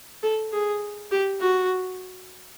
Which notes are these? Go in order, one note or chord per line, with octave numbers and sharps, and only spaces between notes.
A4
G#4
G4
F#4